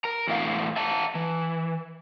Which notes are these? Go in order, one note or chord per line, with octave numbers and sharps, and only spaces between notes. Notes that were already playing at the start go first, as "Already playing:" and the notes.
A#4 A#5
E2 A2 E4 F5
E5 A5 A#5
E3